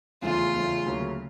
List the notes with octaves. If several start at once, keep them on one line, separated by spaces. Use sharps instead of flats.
E2 C#3 F3 A3 F4
E2 C#3 F3 A3
D2 C#3 F#3 A#3 C#4